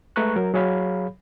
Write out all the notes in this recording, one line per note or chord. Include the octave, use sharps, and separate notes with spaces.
G#3 A3 B4 A#5 C#6 F#6
F#3 A#4
F#3 G#4 C#5 F5 B5